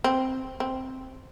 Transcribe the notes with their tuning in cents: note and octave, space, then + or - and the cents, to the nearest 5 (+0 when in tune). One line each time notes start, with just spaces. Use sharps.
C4 +0
C4 +0